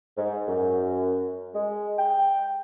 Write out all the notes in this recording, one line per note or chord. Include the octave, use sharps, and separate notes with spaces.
G#2
F#2
G#3
G5